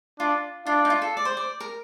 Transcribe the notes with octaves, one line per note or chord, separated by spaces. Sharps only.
D4 F4
D4 F4
D#4
F4
A4
D5
C5
D5
A#4